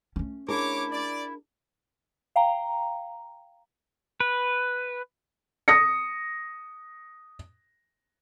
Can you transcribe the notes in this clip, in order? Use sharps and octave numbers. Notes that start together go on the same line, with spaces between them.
A3 C#4
D4 E4 G#4 A#4 C#5 D6
D5
F5 G5 A#5
B4
D#6 A#6 C#7